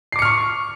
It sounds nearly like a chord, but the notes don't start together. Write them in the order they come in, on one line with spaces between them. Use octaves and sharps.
C7 D6 C#7 F6 C#6